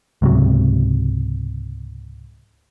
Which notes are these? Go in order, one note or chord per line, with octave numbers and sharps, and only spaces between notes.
C#2 G#2 C3 F#3